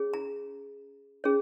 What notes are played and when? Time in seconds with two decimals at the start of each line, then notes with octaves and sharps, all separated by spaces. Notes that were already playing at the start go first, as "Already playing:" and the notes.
Already playing: C#4 G#4 C#5
0.14 A#5
1.24 C#4 G#4 C#5